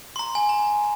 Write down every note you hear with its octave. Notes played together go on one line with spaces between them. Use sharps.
C6
A#5
G#5
A#5